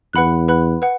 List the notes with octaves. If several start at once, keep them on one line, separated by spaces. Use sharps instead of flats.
E2 B4 F#5 B5 F#6
B4 F#5 B5 F#6
B4 F#5